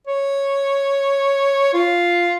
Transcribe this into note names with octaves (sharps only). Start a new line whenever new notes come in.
C#5
F4